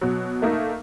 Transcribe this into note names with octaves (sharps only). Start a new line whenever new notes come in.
B2 F#3
A3 A#3 D#4